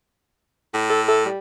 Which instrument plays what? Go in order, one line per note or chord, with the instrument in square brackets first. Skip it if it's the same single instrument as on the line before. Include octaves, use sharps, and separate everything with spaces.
[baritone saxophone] A2
[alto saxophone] A4
A4
G3